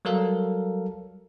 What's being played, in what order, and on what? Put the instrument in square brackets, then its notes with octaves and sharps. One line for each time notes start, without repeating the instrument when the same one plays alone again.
[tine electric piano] F#3 G3 A4 A#4 F5